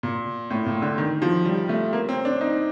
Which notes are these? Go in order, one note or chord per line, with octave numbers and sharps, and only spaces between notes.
A#2
A2
A#2
D3
D#3
F3
G3
A3
A#3
C4
D4
D#4